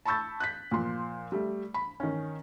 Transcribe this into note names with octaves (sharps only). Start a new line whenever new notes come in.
A5 B5 C#6 E6 G6 A6
F#6 G6 B6
A#2 F3 C6
G3 A3
B5
D#3 C#4